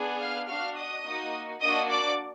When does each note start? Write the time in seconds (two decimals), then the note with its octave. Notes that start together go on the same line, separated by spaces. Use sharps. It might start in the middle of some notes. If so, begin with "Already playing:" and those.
Already playing: B3 D4 G#4
0.19 F5 F6
0.47 D4 F#4 F5 F6
0.76 D#5 D#6
1.04 A#3 D#4 F#4
1.60 A#3 D4 F#4 D#5 D#6
1.89 D5 D6